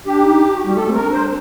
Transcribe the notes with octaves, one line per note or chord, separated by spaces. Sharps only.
D4 G4
D#4
F#4
G3
A3 A4
C4
A#4
D4
C5